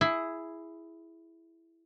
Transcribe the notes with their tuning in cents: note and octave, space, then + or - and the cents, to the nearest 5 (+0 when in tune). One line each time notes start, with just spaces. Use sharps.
E4 +5 G#4 +0